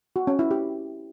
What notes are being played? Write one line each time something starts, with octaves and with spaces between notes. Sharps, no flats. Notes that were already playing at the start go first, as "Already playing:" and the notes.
F#4
C#4
E4
G4